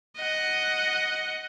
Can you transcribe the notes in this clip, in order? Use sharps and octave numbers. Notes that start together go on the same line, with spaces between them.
D#5 F#5